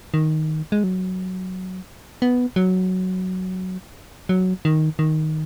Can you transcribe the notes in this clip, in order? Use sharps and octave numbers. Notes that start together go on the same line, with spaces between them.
D#3
G#3
F#3
B3
F#3
F#3
D#3
D#3